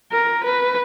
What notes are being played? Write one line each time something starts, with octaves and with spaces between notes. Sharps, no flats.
A#4
B4